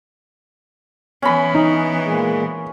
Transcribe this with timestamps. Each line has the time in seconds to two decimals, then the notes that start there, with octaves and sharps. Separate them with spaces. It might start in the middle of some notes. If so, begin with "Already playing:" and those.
1.22 E3 B3 C#4 B5
1.55 D#4
2.03 A#2 G#3